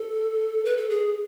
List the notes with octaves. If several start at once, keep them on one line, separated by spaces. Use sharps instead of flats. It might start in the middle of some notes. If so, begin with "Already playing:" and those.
Already playing: A4
B4
A4
G#4